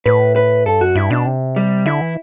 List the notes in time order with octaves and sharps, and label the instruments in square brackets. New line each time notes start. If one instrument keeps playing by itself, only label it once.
[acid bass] A2 [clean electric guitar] B4
[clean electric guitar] B4
[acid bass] G2 [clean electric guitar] A4
[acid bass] F#2 [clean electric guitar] F#4
[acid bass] G2 [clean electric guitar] E4
[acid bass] B2 [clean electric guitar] D4
[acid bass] C3
[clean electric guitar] G3
[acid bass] D3 [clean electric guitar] E4
[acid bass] E3